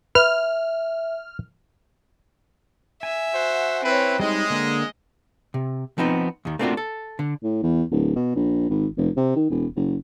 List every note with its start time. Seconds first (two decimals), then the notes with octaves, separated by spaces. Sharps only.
0.15 B4 E5 F6
3.03 E5 G#5
3.34 F#4 C5 F#5
3.84 C4 E4 B4 C#5
4.20 G3 G#3 D#4 D#5
4.50 D3 A#3
5.54 C3
5.98 F3 B3 C4 D#4
6.45 D#2 D#3
6.59 A3 A#3 C4 D4 F4 F#4
6.77 A4
7.19 D3
7.43 A2
7.63 E2
7.91 D1
8.16 B2
8.36 A#1
8.70 G#1
8.97 F1
9.17 C3
9.36 D#3
9.50 E1
9.76 F#1